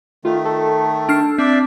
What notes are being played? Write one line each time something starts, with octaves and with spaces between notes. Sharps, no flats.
D#3 A3 F4
A4
D4 F6 C7
C4 D4 D5 E5